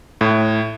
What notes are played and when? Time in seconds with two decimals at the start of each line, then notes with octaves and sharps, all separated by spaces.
0.21 A2